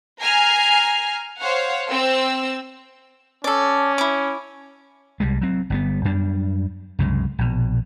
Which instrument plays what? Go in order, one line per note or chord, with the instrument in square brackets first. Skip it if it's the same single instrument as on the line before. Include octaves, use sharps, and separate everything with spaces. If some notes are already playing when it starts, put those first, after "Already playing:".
[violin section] G#5 A#5 F6 C7
C5 C#5 F5 F#5
C4 E6
[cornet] C#4 [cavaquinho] A4 D5
[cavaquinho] E4 D6
[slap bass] C2 G3 G#3
F#3 C4
G1 G3 B3
F#2 G3 D4
C2 F#2 C#3 G#3
A#1 B2